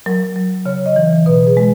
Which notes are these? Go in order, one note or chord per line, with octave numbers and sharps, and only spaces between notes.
F#3 A#4
F#3
C#3 C#5
D#5
E3
B2 B4
G#4
G#3